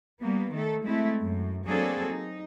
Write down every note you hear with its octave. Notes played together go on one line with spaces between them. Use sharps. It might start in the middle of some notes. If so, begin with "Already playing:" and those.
G3 A#3 B3
D#3 A3 A4
G#3 A3 C4 E4
F#2
F#3 A#3 C4 D4 G#4 A4
D#4